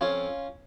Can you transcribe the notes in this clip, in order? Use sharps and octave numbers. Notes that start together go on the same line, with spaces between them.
F2 C#4 F4